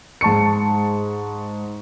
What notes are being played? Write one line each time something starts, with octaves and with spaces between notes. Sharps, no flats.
G#2 A5 C#6 C#7